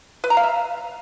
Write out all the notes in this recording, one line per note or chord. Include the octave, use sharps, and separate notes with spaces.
B4
A#5
F5
E5